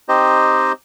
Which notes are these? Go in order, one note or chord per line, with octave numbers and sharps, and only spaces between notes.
C4 D#4 G4 C5 D#5